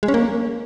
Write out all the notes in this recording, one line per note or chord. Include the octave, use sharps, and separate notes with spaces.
G#3
C#4
A#3